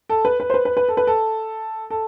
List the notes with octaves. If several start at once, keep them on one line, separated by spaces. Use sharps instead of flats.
A4
B4
B4
C5
B4
B4
B4
A4
B4
A4
A4